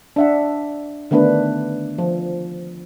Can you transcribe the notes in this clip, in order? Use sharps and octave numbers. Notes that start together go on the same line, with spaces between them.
D4 E5 F#5
D3 D#3 A3 B3 D4 B4
F3